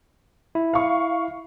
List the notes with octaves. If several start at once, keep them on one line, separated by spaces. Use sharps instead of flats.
E4
F5 C#6